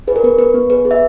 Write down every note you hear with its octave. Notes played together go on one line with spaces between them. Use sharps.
G#4 B4
A#4
B3 B4
B3 B4
B3
G#4 B4
G#4
E5